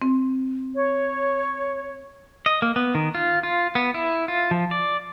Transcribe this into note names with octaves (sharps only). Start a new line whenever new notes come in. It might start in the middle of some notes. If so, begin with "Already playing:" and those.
C4
C#5
D#5
A#3
B3
D#3
F4
F4
B3
E4
F4
F3
D5